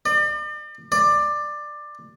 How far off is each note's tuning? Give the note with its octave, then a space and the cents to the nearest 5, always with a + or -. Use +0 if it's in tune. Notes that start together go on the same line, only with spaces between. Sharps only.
D5 +40
D5 +15